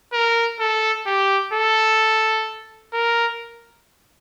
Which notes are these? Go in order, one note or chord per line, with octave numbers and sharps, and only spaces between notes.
A#4
A4
G4
A4
A#4